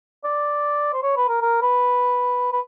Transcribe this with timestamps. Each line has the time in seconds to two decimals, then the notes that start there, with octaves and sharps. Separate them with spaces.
0.24 D5
0.93 C5
1.03 C#5
1.17 B4
1.29 A#4
1.42 A#4
1.62 B4
2.52 B4